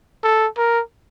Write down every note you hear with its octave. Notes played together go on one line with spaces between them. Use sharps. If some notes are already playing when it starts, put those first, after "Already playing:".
A4
A#4